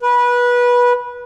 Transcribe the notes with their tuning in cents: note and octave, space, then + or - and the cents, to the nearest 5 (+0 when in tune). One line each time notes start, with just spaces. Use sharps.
B4 -20